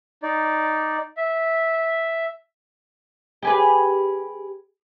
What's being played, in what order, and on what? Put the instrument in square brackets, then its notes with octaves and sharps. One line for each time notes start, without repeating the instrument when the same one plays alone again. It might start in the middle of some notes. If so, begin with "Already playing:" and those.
[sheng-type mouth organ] D#4 D5
E5
[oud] G4 G#4 B4